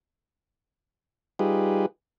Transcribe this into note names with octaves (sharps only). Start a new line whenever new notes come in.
G3 D#4 F4 G4 G#4 B4